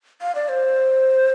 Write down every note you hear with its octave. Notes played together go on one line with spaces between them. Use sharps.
F5
D5
C5